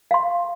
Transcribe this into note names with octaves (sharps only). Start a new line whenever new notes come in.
F5 C6